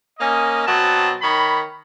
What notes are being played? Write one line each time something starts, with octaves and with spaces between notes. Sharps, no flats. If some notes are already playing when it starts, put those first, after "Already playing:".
A#3 C#4 D#5
B2 F#3 C4 A5
D#3 C#5 B5